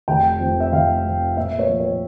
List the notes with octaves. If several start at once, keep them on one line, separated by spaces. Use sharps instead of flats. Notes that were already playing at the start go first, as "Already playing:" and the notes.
F1 G5
F2
E5
F1 F5
F2
A#2 E5
C#5
F3
C#5